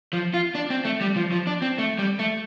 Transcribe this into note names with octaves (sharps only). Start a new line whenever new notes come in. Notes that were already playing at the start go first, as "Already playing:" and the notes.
F3
F4
D4
C4
A3
G3
F3
F3
D4
C4
A3
G3
A3